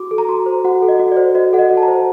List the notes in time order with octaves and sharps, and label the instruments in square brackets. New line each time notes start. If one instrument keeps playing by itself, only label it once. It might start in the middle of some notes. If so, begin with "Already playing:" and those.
Already playing: [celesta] F#4 D6
A4
A#5
F#4 C6
C5
F#4 F#5
A4
D#5
F#4
D5
C5
F#4 D#5
A4 F#5
D#5
F#4
A5
A#5
C5